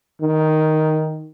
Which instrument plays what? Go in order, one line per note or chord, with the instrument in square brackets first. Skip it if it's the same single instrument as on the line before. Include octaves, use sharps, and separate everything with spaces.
[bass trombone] D#3